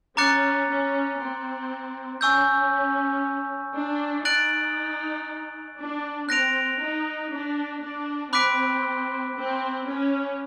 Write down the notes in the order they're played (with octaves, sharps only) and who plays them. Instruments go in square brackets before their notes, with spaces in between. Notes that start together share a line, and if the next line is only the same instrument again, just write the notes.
[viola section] C#4 [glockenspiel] A#5 D6 F#6 A6 C#7
[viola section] C#4
C4
[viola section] C#4 [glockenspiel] G#5 C#6 E6 G6
[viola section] D4
[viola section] D#4 [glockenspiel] F#6 A6 D7 F#7
[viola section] D4
[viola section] C4 [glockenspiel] F#6 A#6 D7 F7
[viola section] D#4
D4
D4
[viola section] C4 [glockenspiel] B5 D6 F#6 B6 D7
[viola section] C4
C#4